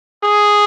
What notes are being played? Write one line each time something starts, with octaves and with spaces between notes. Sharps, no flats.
G#4